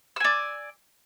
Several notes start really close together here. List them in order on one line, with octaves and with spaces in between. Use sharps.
E6 G#5 D5